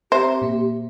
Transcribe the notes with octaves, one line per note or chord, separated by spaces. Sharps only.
C4 G4 C5 E5 A#5
A#2 A#3